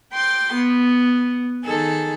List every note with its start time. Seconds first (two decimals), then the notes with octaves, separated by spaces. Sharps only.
0.13 G5 C6 D6
0.53 B3
1.65 D#3 G#4 A4